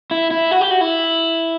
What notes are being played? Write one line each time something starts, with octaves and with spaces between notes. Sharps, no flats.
E4
E4
F#4
G4
F#4
E4